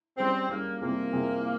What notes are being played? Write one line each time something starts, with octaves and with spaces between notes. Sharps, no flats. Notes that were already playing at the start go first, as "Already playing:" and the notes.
G3 C4 C#4 G#4
G3 A#3 C#4 G#4
C3 G3 A#3 C4 F4 G#4
C3 G3 C4 F4 G#4